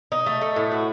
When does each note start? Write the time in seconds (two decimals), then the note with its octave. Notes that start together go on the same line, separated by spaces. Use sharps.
0.12 D#4
0.26 A3
0.42 A3
0.56 A2
0.72 F#4